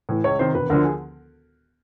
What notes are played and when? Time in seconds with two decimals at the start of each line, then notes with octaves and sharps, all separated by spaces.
0.09 A2 E3
0.24 C#2 C#5
0.39 C3 D#3 C5
0.55 E1 B4
0.70 D2 D3 F3 A#4
0.85 G#4